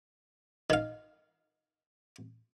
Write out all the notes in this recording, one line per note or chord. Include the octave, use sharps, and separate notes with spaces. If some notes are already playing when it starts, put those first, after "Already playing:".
D#3 F5